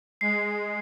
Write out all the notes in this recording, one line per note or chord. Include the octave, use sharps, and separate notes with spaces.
G#3 C7